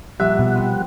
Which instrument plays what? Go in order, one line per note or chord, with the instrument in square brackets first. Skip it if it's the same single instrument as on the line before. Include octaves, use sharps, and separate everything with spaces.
[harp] A#1 [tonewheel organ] G3 F#5 [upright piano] E5
[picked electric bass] B2
[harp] B3 C4